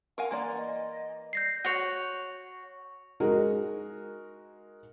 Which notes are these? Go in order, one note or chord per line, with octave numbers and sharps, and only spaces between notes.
A#4 F5 F#5 G#5
E3 A#3 D5 C6
D#5
D5 G6 A#6 C7
F#4 C#5
G#3 D#4 F#4 G#4 A#4